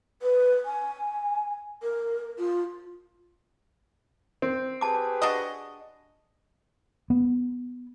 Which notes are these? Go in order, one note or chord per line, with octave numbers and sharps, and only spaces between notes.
B4
G#5
A#4
F4
C4
G4 G#4 B4 A5 D6
D4 F#4 D#5
B3